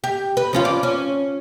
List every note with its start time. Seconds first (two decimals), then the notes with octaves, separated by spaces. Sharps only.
0.04 G4
0.37 B4
0.53 F3 C#4 F4
0.65 D5
0.83 C#4